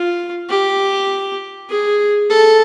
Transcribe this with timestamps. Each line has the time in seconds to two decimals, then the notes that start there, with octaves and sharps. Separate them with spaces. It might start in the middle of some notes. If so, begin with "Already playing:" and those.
Already playing: F4
0.49 G4
1.70 G#4
2.30 A4